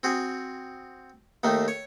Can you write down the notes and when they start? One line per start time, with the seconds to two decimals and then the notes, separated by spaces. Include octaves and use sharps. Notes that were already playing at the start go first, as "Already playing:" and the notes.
0.03 C4 F#4 G#4
1.44 D#2 D#3 A3
1.68 C#5